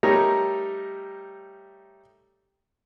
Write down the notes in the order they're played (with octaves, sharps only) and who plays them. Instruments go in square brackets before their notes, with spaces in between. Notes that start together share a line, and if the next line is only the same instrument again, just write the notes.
[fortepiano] G3 A3 D#4 A#4 C#5 D#5